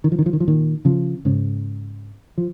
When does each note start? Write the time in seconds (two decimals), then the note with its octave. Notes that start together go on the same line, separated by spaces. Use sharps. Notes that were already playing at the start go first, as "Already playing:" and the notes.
0.04 D#3
0.12 F3
0.19 D#3
0.26 F3
0.33 D#3
0.40 F3
0.48 A#2 D#3
0.85 C#3 F3
1.25 G#2 C#3
2.38 F3